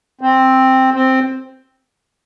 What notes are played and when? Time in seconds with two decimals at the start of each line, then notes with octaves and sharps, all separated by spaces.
0.21 C4
0.94 C4